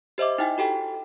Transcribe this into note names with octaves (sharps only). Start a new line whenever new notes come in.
G4 C5 D#5 E5 D6
D#4 E4 G5 G#5
F#4 G4 A4 G5